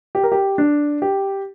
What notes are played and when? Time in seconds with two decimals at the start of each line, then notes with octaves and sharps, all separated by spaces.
0.15 G4
0.23 A#4
0.32 G4
0.58 D4
1.02 G4